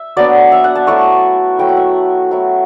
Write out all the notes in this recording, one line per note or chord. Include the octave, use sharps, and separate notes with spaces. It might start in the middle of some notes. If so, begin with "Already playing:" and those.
Already playing: E5
F#3 B3 D4 D5
E5
F#5
A5
F#3 A3 E4 C#6
F#3 A3 E4 G5
F#5
E5
F#3 A3 E4